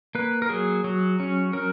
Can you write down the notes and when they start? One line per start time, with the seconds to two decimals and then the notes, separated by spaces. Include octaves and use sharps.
0.15 A#3 B4
0.42 A#4
0.49 F#3 G#4
0.84 F#3
1.20 C#4
1.53 F#3 A#4